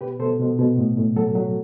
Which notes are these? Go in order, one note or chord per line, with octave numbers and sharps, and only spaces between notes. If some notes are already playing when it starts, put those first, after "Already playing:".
B2 G4 B4
B2 A4 C5
B2
B2
A2
A2
F#3 F#4 A4
F#3